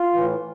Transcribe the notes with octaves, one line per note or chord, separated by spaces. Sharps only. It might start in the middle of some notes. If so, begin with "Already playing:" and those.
Already playing: F4
A2 E3